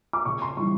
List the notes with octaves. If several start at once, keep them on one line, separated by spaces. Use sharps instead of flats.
D6
C#3 C#6
C6
E3 G3 C#6